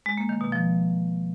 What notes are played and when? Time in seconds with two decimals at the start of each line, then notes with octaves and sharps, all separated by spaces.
0.06 G#3
0.18 A#3
0.29 D#3
0.41 B2
0.52 F3